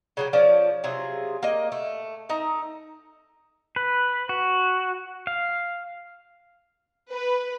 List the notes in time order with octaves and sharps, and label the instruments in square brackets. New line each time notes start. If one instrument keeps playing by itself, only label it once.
[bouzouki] C#3 F#3 G4
F3 C#4 D5 A5
C3 F#3 F4 G#4
A#3 D#5
A3
A3 D#4 A#5
[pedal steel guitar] B4
F#4
F5
[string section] B4